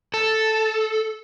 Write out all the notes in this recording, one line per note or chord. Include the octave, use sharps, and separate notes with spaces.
A4